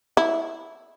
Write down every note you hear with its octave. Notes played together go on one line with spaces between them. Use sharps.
E4